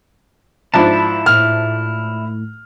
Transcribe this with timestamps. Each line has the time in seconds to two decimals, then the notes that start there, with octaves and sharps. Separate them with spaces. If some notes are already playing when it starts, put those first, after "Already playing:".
0.74 G#2 F3 D4 E4 E5 A5 B5
1.26 A2 F6